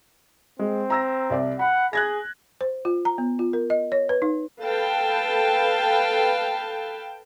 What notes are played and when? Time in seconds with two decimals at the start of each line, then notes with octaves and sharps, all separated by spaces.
0.59 G#3 C4
0.90 A#5 E6 A#6
1.30 C2 D5 E5
1.59 F#5 B5
1.93 G#4 F#6 G#6 A#6
2.61 C5
2.85 F4
3.05 A#5
3.18 B3
3.39 F4
3.53 A#4
3.70 D#5
3.92 C#5
4.09 B4
4.22 D#4
4.62 A4 B4 F5 G5 A5